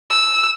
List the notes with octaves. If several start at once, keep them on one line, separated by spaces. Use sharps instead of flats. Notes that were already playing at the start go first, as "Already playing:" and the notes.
E6